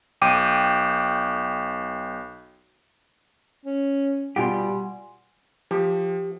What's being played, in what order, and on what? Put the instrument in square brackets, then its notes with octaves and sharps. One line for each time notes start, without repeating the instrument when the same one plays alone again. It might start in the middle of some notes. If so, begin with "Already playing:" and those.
[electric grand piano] B1 G5 D6 D#7
[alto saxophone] C#4
[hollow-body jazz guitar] B2 F4 G4 [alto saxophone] G3 [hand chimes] F#5 G#5 C6
[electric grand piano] F3 [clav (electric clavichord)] G4